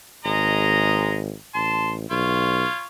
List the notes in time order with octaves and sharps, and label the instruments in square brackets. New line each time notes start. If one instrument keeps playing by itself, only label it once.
[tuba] G#1 [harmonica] G#3 D#5 A#5
[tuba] A1 [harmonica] A5 C6
[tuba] B1 [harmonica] F4 C#5